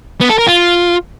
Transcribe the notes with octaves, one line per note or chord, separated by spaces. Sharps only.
B3
A4
A#4
F4